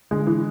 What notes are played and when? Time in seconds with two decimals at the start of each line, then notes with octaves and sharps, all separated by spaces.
0.11 D3 G#3
0.27 E3